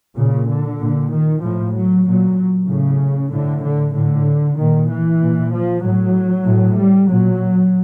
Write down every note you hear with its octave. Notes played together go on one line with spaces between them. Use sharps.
A#2 C#3
D3
A#2
D#3
A2 F3
F#3
A#2 F#3
A2 C#3
A2 D3
D3
A2 D3
A#2 D#3
E3
A#2
F3
A2 F#3
A2
G3
A#2 F#3